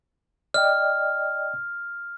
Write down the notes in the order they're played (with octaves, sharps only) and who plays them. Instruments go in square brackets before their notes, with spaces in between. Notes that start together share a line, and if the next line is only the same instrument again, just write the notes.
[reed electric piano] D5 D#5 G5 [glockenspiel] F6